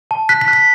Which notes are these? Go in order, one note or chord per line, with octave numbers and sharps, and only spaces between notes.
A5
F#6 B6
B6
F#6
B6